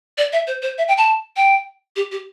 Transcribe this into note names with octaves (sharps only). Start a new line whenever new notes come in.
D5
E5
C5
C5
E5
G5
A5
G5
G4
G4